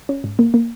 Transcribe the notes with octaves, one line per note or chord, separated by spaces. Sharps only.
C#4
G#2
A#3
A#3